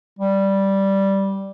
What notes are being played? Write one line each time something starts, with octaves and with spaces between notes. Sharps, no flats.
G3